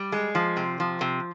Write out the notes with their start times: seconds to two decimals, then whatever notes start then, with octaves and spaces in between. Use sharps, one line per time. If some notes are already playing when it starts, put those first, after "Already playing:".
Already playing: G3
0.12 G#3
0.35 F3
0.57 C3
0.80 F3
1.01 C3